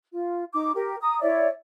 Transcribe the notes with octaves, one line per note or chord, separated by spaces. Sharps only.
F4
D#4 D6
G4 A#4
A#5 D#6
E4 C#5 D5 E5